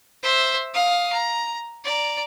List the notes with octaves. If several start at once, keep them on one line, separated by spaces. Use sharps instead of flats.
C5 E5
F5 D#6
A#5
D5 A#5